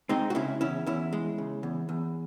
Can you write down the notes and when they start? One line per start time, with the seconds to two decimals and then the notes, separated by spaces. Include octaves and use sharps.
0.09 G#3 C4 D#4
0.30 F#4
0.35 C#3 C#4 E4
0.61 E2 C#4 E4
0.86 E2 C#4 E4
1.13 G#3
1.38 C#3
1.63 E2
1.89 E2